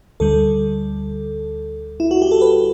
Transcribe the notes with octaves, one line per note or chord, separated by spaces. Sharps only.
D2 D3 G3 A4
E4
F#4
G4
A4
B4